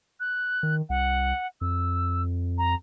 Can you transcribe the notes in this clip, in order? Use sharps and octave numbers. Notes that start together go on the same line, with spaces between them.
F#6
D#3
C2 F#5
F2 E6
A#5